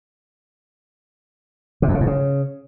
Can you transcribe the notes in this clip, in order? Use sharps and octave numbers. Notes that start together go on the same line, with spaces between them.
C3
F2
C#3
G#2
C#3